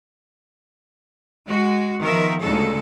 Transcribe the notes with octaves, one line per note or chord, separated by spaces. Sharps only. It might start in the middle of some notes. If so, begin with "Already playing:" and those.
G#3 F#4
D#3 F3 B3 A#4 E5
D2 A#2 C#3 G#3 D#4 A4